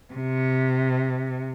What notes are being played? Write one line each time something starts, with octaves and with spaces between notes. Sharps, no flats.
C3